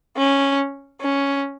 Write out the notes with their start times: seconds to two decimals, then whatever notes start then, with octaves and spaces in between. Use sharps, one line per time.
0.17 C#4
1.02 C#4